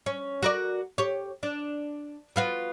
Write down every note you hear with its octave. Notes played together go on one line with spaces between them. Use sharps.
C#4
F#4 A#4 D5
G4 C#5
D4
B3 F4 F#4